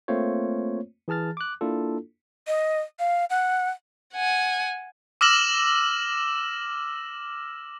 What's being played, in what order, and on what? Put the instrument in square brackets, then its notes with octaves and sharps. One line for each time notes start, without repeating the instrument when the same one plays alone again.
[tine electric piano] A3 A#3 C4 F4 C5 C#5
E3 G#4 A5 F6 A6
D6 F#6
A#3 D4 E4 F4 A4
[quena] D#5
F5
F#5
[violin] F#5 G#5
[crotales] D6 E6 F6 A#6 E7 F#7